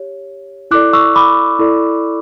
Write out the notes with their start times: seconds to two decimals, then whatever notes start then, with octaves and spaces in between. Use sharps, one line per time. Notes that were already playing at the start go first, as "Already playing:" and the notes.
Already playing: G4 C#5
0.71 E4 A4 D5 D6 F#6
0.93 C#6 E6
1.16 B5 D6
1.59 E4 A4 D5